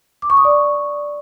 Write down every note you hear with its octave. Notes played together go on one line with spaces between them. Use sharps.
D6
C#6
D#6
D5